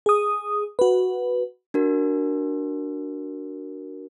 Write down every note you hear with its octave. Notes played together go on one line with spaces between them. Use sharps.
G#4 D#6
F#4 B4
D4 F#4 A#4